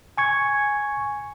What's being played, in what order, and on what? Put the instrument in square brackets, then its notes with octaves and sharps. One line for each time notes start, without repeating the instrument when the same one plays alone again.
[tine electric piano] G#5 C#6 G#6